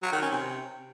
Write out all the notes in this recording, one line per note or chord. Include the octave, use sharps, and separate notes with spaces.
F#3
D#3
C#4
C3